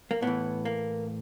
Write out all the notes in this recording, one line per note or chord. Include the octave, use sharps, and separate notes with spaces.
A#3
A2 E3 B3
A#3